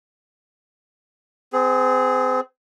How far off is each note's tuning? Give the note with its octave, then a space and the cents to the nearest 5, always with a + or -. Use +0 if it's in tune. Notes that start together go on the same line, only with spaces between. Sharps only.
C4 -35 G#4 +0